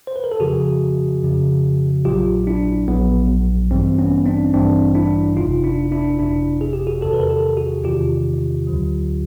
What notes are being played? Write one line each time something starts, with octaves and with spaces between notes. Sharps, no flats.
C5
B4
A#4
A4
F2 C#3 F3 F#4 G#4
F2 C#3 F3
A#1 A#2 F#3 F4 G4
D4 E4
A#1 A#2 F#3 B3
A1 G2 E3 G3 C4
B3 C#4
C4 D4
A1 G2 E3 G3 C4 D4
D4 E4
G1 F2 C3 D#4 F4
D4 E4
D4 E4
G1 F2 C3 D4 E4
G#4
G4
F#4 G#4
E2 C3 D#3 G4 A4
B4
A#4
G4 A4
F#4 G#4
E2 C3 D#3 F4 G4
D2 D3 F#3